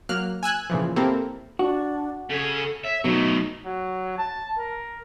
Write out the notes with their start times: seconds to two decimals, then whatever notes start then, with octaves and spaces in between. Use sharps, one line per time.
0.09 F#3 A#3 F6 F#6
0.43 G#5 E6 F#6 G#6
0.70 A#2 C#3 E3 F3
0.96 A#3 C4 E4 G4 A4 A#4
1.59 D4 F#4
2.30 C#3 A4 C#5
2.84 C#5 E5
3.04 B2 F#3 A3 D#4
3.66 F#3
4.18 A5
4.58 A#4